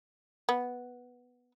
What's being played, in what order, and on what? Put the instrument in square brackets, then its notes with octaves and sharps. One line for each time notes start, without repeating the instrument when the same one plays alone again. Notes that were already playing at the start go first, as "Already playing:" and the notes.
[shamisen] B3